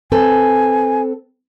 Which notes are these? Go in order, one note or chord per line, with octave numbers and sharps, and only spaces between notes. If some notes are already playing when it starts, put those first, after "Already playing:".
C4 A4 B4 G#5